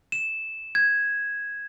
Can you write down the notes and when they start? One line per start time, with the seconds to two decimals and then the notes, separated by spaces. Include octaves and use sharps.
0.12 E7
0.75 G#6